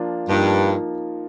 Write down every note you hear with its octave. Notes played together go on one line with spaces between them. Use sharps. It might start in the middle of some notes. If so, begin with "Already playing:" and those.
Already playing: F3 A#3 D4 F4
G2 F3 A#3 D#4